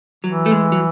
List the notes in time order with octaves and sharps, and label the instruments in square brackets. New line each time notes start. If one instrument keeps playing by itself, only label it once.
[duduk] E3 [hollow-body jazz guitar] F#3
[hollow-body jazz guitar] A3
G#3
F#3